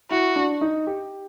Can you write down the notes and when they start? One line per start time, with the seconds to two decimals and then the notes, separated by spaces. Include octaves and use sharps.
0.11 E4 F#4
0.36 D4
0.61 D#4
0.87 G4